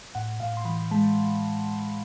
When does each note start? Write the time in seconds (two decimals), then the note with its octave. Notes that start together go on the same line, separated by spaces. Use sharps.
0.15 A2 F#5
0.40 A2 F5
0.57 C6
0.65 E3 B5
0.91 G#3 A5